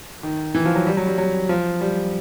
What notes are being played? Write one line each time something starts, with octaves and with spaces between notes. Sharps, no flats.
D#3
E3
F3
F#3
G3
F#3
G3
F#3
F3
G3